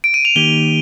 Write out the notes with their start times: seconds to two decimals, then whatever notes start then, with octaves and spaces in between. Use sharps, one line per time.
0.04 D7
0.14 D#7
0.25 F7
0.36 D#3 A#3 D#4 G4 G7